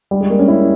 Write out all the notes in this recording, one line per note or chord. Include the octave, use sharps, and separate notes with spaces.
G3
G#3
A#3
C#4
E4